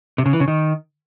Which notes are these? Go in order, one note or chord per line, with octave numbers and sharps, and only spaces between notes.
C3
C#3
E3
C#3
D#3